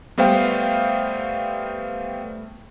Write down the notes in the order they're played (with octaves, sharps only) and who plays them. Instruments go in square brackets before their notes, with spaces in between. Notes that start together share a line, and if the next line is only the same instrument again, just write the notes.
[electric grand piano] G3 A3 B3 C5 F5 G5